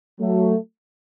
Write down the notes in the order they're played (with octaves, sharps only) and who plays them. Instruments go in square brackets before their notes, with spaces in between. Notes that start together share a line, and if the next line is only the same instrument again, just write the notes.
[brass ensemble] F#3 A3